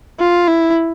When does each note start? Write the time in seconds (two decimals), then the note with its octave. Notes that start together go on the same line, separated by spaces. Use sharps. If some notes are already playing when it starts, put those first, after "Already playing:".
0.20 F4
0.48 E4